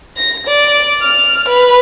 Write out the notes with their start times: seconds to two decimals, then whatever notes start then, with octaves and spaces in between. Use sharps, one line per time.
0.17 A#6
0.48 D5
1.02 F6
1.49 B4